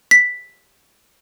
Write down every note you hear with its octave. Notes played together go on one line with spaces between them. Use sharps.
B6